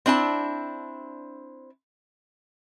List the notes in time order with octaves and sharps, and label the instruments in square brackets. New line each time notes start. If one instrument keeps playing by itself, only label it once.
[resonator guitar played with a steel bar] C4 D4 E4 A5